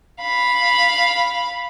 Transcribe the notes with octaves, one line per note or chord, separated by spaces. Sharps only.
F5 B5